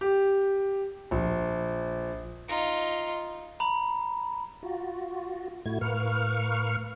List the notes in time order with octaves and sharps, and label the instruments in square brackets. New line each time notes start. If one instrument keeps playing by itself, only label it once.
[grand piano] G4
A#1
[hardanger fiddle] D#4 F4
[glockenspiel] A#5 B5
[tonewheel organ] F4 F#4
A2 A3 E4 F#4 G#6
A2 A#4 B4 F5 C#6 F6